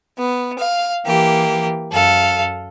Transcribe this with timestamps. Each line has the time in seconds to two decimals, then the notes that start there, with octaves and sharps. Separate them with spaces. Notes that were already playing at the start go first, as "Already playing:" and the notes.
0.17 B3
0.57 F5
1.04 E3 A#3 G4
1.92 F#2 A4 F5